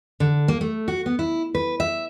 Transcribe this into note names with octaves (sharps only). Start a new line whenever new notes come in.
D3
A#3
A3
F#4
B3
E4
B4
E5